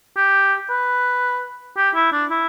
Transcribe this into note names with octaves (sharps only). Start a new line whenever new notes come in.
G4
B4
G4
E4
D4
E4